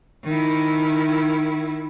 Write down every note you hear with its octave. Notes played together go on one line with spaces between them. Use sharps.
D#3 E4